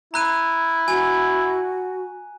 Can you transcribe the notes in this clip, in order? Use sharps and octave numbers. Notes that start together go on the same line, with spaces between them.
E4 A#5 F#6 D#7
F#4 G#5